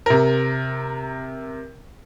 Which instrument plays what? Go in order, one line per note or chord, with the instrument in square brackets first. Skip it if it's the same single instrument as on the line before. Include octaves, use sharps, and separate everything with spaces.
[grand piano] C3 A#4